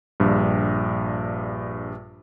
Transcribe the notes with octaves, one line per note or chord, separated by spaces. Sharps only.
A#1 G2